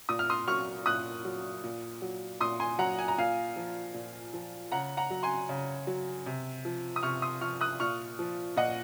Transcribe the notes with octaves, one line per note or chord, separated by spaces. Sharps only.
A#2 D#6
F6
C6 D#6
F#3 C#6 F6
A#2 D#6 F#6
F#3
A#2
F#3
A#2 C6 D#6
G#5 C6
F#3 F#5 A#5
G#5
A#5
A#2 F5 G#5
F3
A#2
F3
C#3 F#5 A#5
F#5 A#5
F#3
G#5 C6
C#3
F#3
C3
F3
D#6
C3 C#6 F6
C6 D#6
F3 C#6 F6
D#6 F#6
A#2 C#6 F6
F3
A#2 D#5 F#5